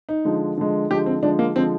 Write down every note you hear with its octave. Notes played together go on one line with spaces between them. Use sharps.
D#4
D3 F3 G#3
D3 F3 G#3
D3 F3 G#3 G4
C4
D3 F3 G#3 D4
A#3
D3 F3 G#3 C4